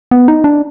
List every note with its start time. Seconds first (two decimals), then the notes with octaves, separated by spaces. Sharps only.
0.11 B3
0.28 D#4
0.44 D4